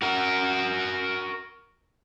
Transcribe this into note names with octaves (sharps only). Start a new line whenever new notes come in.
F#4 A#4